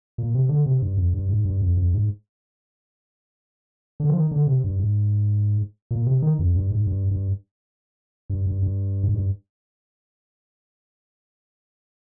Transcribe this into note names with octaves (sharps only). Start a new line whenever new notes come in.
A#2
C3
D3
C3
G2
F2
G2
G#2
G2
F2
F2
G#2
D3
F3
D#3
D3
C3
G2
G#2
A#2
C3
D#3
F2
G2
G#2
G2
G2
G2
G2
G2
G#2
G2